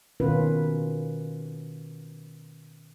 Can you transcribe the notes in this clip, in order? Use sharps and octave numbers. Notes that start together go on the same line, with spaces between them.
B2 D#3 A#3 C#4 F4 B4